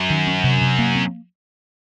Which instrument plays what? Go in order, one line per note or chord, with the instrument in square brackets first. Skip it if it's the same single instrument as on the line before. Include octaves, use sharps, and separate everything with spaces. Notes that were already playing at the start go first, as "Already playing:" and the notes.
Already playing: [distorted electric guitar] F#2
[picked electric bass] D#3
C#4
C3
C3
A#3
C4